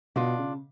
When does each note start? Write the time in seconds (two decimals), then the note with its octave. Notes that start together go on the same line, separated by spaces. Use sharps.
0.16 B2 D4 F4
0.38 C#3